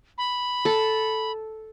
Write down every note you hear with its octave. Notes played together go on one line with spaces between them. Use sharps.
B5
A4